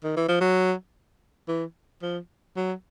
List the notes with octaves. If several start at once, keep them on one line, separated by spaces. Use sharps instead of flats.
D#3
E3
F3
F#3
E3
F3
F#3